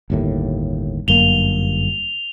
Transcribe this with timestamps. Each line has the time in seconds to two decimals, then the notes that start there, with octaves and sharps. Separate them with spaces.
0.10 G1 D#2 A2
1.08 G1 F#2 A#3 F7 G7